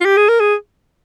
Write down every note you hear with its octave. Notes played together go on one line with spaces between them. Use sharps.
F4
G4
G#4
A#4
G#4